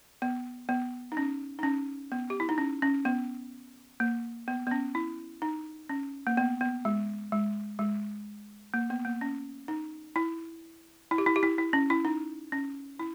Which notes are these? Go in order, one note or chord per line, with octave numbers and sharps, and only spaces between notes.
B3
B3
D#4
C#4
D#4
C#4
B3
G4
E4
D#4
C#4
C#4
B3
A#3
B3
B3
C#4
E4
D#4
C#4
A#3
B3
B3
G#3
G#3
G#3
A#3
B3
A#3
C#4
D#4
E4
E4
G4
E4
G4
E4
E4
C#4
E4
D#4
C#4
E4